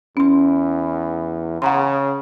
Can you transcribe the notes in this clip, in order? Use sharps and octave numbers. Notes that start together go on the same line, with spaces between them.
E2 C#4 C6
C#3 F#5 A#5 C6